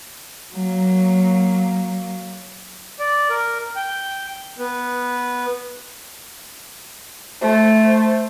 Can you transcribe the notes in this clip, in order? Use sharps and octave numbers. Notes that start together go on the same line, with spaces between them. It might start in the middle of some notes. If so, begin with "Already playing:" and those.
F#3 A#3
D5
A#4
G5
B3
A3 C5